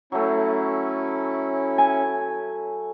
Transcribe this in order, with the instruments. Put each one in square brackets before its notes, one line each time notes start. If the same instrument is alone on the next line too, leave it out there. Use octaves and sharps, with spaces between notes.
[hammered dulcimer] F#3 A3 [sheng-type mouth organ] C#4 E4
[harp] G#5